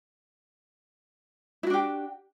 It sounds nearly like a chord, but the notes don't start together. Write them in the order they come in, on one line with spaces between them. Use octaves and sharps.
E4 F#4 D4 G4